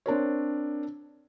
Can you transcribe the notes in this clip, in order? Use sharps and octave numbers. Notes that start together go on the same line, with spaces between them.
C4 D4 A#4 C#5